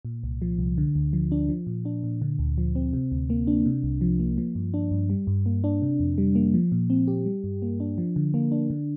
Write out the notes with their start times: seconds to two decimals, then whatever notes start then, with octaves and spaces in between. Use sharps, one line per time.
0.05 A#2
0.24 C2
0.42 F3
0.59 C2
0.78 D3
0.95 D2
1.13 F3
1.32 D4
1.49 F3
1.67 A#2
1.85 D4
2.03 A#2
2.22 D3
2.39 D2
2.58 F3
2.75 C4
2.93 C3
3.12 D2
3.30 A#3
3.47 D4
3.66 C3
3.83 C2
4.01 F3
4.19 A#3
4.38 F3
4.55 G2
4.74 D4
4.91 G2
5.10 G3
5.27 G2
5.46 A#3
5.64 D4
5.82 C3
6.00 F2
6.18 G3
6.35 A#3
6.54 F3
6.72 A#2
6.90 C4
7.08 G4
7.26 G3
7.44 G2
7.62 A#3
7.80 D4
7.98 F3
8.16 D3
8.34 A#3
8.52 D4
8.70 D3